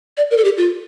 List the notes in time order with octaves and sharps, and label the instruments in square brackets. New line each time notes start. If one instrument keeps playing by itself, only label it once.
[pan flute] D5
A#4
A4
G4
F4